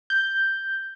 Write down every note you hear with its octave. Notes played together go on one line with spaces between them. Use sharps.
G6